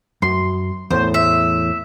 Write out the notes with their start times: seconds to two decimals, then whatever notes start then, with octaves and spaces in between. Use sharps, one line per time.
0.22 F#2 C6
0.91 E2 A2 C5
1.14 E5